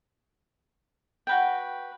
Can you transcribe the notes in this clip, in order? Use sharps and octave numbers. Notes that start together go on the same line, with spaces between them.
F#4 B4 G5